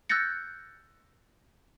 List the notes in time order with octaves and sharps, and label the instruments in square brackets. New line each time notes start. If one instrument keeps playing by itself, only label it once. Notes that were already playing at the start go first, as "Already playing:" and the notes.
[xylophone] E6 F#6 G6 A6 A#6 C#7